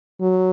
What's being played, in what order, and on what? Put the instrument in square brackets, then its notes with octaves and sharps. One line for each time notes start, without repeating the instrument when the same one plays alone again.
[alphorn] F#3